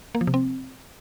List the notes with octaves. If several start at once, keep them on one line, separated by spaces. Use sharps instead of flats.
A#3
F3
C3
C4